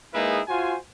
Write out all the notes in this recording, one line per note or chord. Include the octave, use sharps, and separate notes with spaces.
G#3 A#3 D#4 E4 G#4 B4
F4 F#4 C5 G#5